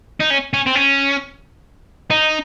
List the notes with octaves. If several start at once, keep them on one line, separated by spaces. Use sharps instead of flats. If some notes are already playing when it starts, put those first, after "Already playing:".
D#4
C#4
C#4
C4
C#4
D#4